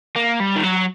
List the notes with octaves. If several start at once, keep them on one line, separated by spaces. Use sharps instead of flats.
A#3
G3
D#3
F#3